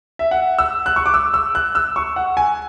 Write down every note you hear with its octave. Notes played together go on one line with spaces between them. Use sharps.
E5
F#5
E6
F#6
C#6
D6
E6
E6
F#6
E6
C#6
F#5
G#5